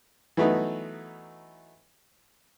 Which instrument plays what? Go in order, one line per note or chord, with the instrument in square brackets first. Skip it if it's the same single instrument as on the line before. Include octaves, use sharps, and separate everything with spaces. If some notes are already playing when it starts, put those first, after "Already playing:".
[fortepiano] E3 F#3 A3 B3 D#4